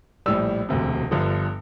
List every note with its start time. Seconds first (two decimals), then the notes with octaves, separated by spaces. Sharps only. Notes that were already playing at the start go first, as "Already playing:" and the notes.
0.26 A#1 A2 G3 E6
0.69 E1 D2 C3
1.11 G1 G2 D3 F3